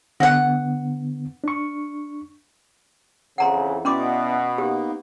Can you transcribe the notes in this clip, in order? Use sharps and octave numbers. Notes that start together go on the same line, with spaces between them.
D3 B3 F#4 F#5
D4 C#6
F2 C#3 E3 F#5 A#5 C6
B2 B3 C#4 E4 D5 C6 D6
A#3 B3 D#4 G4